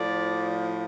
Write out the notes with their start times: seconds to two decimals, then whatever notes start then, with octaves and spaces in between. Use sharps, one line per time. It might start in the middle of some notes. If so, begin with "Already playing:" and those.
Already playing: A2 F3 D5